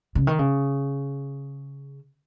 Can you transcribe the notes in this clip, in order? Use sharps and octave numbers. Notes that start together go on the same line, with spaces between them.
C#3
D#3
C#3